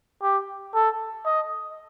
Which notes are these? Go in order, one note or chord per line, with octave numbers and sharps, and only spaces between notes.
G4
A4
D#5